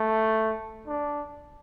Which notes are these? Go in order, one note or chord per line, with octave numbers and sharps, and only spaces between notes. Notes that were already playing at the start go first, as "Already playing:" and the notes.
Already playing: A3
D4